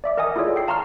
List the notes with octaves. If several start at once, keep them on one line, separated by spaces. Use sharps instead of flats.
D5 E5 D6
A#4 D#5 F#5 G#5 D#6
E4 F4 G#4 A4 C#5 D5
G5 C7
F5 A5 A#5 C6 C#6 F6